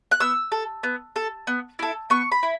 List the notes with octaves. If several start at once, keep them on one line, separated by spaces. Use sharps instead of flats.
F#6
B3 E6
A4
B3
A4
B3
E4 A4
B3 C#6
B5
E4